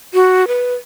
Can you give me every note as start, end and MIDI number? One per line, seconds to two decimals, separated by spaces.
0.14 0.47 66
0.48 0.74 71